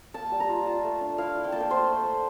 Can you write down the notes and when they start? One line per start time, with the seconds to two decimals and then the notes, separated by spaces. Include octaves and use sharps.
0.14 A#3 A5
0.31 G3
0.40 A#5
0.49 F4
0.66 F4 A5
0.84 A3
1.01 D4
1.18 E4 F5
1.36 E4
1.44 G5
1.52 A#3 A5
1.60 G5
1.70 A3 C5
1.88 A3
2.05 A3